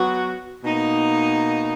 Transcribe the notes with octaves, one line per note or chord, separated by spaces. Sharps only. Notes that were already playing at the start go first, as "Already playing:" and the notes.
Already playing: F#3 B3 F#4
B2 A#3 D#4